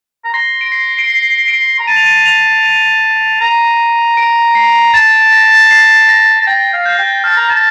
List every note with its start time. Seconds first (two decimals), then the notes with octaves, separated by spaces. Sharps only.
0.25 A#5
0.34 C6 A#6
0.61 D7
0.72 C7
0.99 D7
1.10 C7
1.48 D7
1.79 A#5
1.87 A5 D#7
1.96 F7
2.06 D#7
2.26 F7
2.63 D#7
3.41 A#5
4.17 D7
4.55 C7
4.94 A5 A6
5.32 A#6
5.71 C7
6.09 A#6
6.41 A5
6.47 G5 A6
6.73 F5
6.86 G6
6.98 G5
7.24 A5 F6
7.37 A#5
7.49 A5